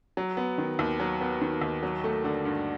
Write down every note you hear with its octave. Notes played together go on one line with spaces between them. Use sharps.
F#3
B3
D#3
D#2
F#3
B3
D#3
D#2
F#3
A3
D3
G2